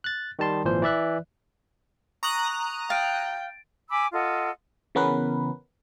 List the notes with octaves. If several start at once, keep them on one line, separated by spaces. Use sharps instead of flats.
F#6 A6
D#3 G3 A5 C6
G#1 A#2 E3 F3 C5
E3 D5 E5 F#6
A#5 C#6 D#6 F#6
F5 G5 A6 D7
G#5 B5 D6 E6
F4 A4 D#5 F#5
C#3 E3 B3 C#4 A#4 B4